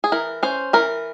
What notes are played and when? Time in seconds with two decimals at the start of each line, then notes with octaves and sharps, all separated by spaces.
0.04 G#4
0.12 E3 A#4
0.43 C#4 C5
0.73 E3 A#4